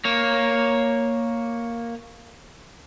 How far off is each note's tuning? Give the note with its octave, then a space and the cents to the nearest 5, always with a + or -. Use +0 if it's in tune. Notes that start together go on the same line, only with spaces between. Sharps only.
A#3 +0 C#5 +0